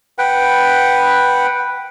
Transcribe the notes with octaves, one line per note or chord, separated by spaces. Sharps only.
B4 F#5 G5